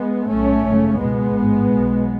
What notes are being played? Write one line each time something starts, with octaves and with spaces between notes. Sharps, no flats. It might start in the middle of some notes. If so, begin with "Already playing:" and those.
Already playing: G#3 B3
B1 A2 A3 C#4
G#1 F#2 C#3
C#2 B2 G#3 B3
A1 G#2
B1 B2